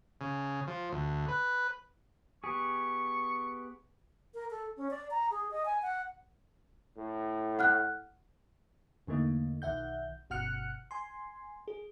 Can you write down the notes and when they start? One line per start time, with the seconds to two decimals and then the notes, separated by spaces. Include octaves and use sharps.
0.21 C#3
0.67 F3
0.92 D2
1.28 B4
2.44 B3 G4 G#4 C#6
4.34 A#4
4.51 A4
4.77 C#4
4.91 D5
5.11 A#5
5.31 G#4
5.51 D#5
5.65 G#5
5.82 F#5
6.97 A2
7.59 F#5 F6 F#6
9.07 E2 D3 A3 A#3 D#4
9.62 B1 D#3 E5 F#5 G6
10.30 G1 B2 F#5 F6 F#6 C#7
10.91 G#5 C6
11.68 G#4